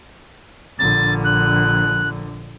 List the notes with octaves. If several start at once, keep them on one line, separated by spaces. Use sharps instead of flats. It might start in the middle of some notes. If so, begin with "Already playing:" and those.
A#1 D3 A6
F#6